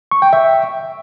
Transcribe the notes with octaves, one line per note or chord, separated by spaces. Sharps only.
C#6
G5
E5